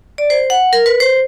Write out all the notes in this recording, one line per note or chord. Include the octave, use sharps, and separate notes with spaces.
D5
C5
F#5
A#4
B4
C5